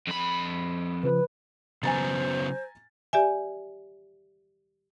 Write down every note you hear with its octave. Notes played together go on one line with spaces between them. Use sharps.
F2 B5
C#3 F3 B4
C#3 F#3 B3 C5 G#5 A#5 A6
G4 D5 E5 G#5